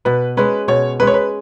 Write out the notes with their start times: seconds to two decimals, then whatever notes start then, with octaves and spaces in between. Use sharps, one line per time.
0.05 B2 B4
0.37 G#3 C#4 B4
0.68 B2 C#5
1.00 G#3 C#4 B4
1.07 C#5
1.14 B4